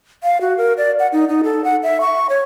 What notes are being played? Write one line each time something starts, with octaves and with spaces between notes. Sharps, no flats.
F5
F#4
A#4
D5
F#5
D#4
D#4
A4
F#5
E5
C#6
C#5